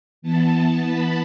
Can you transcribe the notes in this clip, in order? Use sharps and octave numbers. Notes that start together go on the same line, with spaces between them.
E3 B3 A5
A5
B5